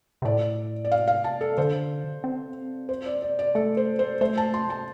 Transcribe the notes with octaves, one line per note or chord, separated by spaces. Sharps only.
C3
A2 D5
D5
F5
F5
A5
A4
D3 C5
C4
C5
D5
D5
D5
A3 A4
C5
C5
A3 C5
A5
C6
A5